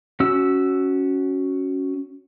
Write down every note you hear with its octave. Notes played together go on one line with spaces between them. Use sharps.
C#4 F#4 E6